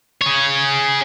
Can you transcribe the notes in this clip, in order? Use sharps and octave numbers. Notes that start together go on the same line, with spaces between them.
G#4 C#5